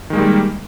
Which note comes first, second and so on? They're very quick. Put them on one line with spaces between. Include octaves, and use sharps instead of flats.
D#3 G#3 A#3 G3